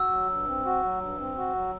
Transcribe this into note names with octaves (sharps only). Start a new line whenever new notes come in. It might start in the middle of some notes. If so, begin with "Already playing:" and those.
Already playing: F#4 E6
F#3
G2
C4
F#4
F#3
G2
C4
F#4
F#3